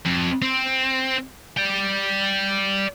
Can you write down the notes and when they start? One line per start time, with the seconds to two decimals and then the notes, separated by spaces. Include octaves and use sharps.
0.06 F2
0.42 C4
1.57 D5 G5